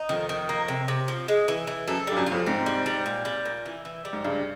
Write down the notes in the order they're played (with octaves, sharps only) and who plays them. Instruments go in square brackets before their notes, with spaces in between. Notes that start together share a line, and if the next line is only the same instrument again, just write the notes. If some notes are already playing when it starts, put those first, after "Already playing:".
Already playing: [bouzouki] D#4
[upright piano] F2 [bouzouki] D#3
[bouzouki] D#3
A#3
C3
C3
F3
G#3
E3
E3
[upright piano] F#2 [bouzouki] A4
[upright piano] G2 [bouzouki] G3
[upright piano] F#2
[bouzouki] F4
[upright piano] F2
[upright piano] G#2 [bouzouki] C4
[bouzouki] G3
G3
A#2
G3
A#2
E3
E3
G3
[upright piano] G#2
[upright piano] G2 [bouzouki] C#3